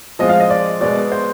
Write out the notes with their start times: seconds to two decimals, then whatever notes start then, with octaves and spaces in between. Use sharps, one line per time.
0.19 F3 G#3 C4 F4 D#5
0.29 F5
0.40 D#5
0.50 D5
0.80 B2 G#3 B3 D5
1.12 C5